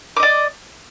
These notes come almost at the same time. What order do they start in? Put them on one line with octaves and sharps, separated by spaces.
D6 D#5 D5